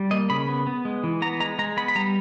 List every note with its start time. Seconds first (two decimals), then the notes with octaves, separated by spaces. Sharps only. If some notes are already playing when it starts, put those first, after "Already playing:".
Already playing: G3
0.11 A#3 D#5
0.30 C#3 B5
0.48 B3
0.67 B3
0.85 G#3
1.04 E3
1.22 B3 A#5
1.40 G#3 A#5
1.59 G#3 A#5
1.77 B3 B5
1.88 B5
1.95 G3 A#5